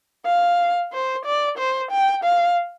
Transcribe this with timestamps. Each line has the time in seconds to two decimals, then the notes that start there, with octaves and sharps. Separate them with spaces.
0.26 F5
0.93 C5
1.26 D5
1.58 C5
1.91 G5
2.24 F5